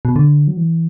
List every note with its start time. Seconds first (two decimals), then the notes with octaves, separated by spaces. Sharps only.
0.05 B2
0.16 D3
0.48 F#3
0.57 E3